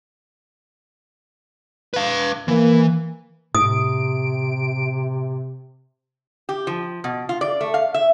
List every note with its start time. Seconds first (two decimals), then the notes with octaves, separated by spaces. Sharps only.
1.94 B4 F5
2.48 E3 A#3
3.55 A2 C3 D#6 D7
6.49 G4
6.67 F3
7.04 B2
7.29 F4
7.41 D5
7.61 A3
7.74 F5
7.94 E5